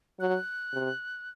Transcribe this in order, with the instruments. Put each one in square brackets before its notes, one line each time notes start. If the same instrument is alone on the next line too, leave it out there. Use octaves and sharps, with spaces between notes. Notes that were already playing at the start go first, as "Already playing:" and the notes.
[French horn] F#3 [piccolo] F#6
[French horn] C3